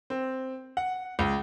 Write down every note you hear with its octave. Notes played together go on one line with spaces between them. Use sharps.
C4
F#5
C#2